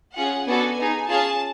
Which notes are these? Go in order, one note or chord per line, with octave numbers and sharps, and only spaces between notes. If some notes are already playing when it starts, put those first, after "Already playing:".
C#4 F4 G#4 F#5
B3 D4 F#4 A4 G#5
B3 D#4 G#4
C#4 F4 G#4 A5